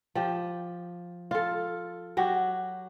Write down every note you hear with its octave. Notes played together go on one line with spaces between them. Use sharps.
F3 G4
F4 A4
F#3 F#4 G4